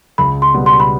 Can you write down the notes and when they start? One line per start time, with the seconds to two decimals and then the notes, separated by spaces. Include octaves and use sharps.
0.18 C#2 B5
0.42 C6
0.54 B2 G3 B3
0.66 C6
0.80 B5